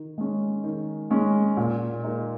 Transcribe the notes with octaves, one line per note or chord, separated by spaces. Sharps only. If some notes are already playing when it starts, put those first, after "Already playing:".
Already playing: D#3
G#3 C#4
D#3
G#3 C#4
A#2
A#3 D#4